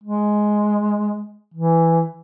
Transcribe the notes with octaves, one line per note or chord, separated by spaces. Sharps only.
G#3
E3